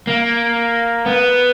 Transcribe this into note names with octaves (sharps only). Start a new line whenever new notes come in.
A#3
B3